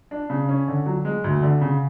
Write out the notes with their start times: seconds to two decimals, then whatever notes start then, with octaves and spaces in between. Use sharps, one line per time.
0.11 D4
0.30 C#3
0.49 C#4
0.68 D3
0.86 F#3
1.05 G#3
1.24 D2
1.42 D3
1.61 C#3